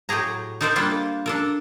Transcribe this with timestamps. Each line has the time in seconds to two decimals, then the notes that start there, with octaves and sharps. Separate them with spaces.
0.09 A2 F#3 G4 G#4 A#5
0.61 D#4 A4 A#4 C5 D5 E5
0.76 G3 A#3 D4 F4 F#5
1.26 D4 A4 A#4